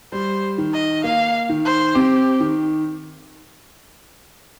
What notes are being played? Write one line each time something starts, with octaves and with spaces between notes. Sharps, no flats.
G3 C5
D#3
D#5
A#3 F5
D#3
C5
C4 G4
D#3